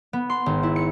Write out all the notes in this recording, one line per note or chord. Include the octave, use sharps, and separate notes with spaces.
B3
C6
G#1
E4
C#7